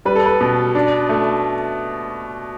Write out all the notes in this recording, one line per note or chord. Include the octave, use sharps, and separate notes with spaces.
G3 B4
A4
B4
B2
D4
A3